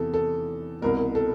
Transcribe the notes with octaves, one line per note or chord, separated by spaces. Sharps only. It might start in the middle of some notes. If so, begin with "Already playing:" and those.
Already playing: E2 C3 E3 A4
A4
C2 B2 A#4
A4